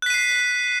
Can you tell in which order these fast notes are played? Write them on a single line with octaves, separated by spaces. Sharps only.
F#6 B6 D#7 C7